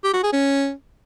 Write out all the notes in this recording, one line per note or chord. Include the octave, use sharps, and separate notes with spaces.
G4
F#4
G#4
C#4